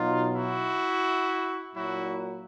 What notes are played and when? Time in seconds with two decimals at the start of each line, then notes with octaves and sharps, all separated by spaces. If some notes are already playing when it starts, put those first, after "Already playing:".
Already playing: B2 F#3 D#4 F4
0.35 E4 F#4
1.75 A#2 F#3 E4 F#4